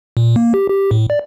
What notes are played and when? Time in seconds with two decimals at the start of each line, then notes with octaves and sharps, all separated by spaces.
0.17 A#2
0.36 A#3
0.54 G4
0.69 G4
0.91 A2
1.10 D5